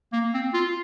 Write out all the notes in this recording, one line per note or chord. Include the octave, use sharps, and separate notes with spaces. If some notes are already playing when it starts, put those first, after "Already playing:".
A#3
C4
F4